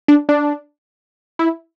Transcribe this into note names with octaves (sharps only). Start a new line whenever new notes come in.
D4
D4
E4